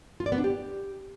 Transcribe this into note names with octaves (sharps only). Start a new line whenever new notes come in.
F4
D5
B3
D4
G4